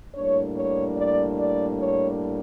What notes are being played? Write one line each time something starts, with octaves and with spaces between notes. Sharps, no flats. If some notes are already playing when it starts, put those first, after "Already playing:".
A2 G3 A#3 D4 C#5
C#5
D5
D5
C#5